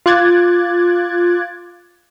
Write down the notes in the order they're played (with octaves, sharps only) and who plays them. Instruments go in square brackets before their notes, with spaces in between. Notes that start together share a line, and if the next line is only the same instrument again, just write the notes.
[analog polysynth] F4 D6 F#6 G#6 A6